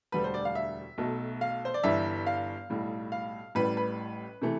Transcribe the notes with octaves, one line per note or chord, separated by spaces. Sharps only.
E1 D2 D3 G3 B4
C5
D5
F5
E5
B1 B2 A3
F5
C5
D5
G1 G2 E3 G3 E5
F5
B1 A2 G3
F5
A1 A2 G3 B4
B4
C3 E3 A3